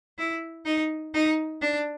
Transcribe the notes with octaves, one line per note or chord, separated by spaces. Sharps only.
E4
D#4
D#4
D4